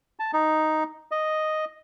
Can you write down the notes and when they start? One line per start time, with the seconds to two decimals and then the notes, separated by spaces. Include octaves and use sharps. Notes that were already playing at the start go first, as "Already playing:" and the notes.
0.19 A5
0.33 D#4
1.11 D#5